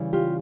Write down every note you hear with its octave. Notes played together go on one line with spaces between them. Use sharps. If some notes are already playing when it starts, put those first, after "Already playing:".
Already playing: C#3 E3 G3
F4 G4